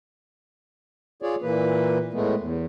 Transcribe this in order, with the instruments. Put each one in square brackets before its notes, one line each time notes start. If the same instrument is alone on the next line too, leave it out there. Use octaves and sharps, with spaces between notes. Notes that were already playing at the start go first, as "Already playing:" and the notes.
[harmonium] F4 G#4 C#5 D5
A#2 E3 A#3 B4
A2 G#3 A3 B3
E2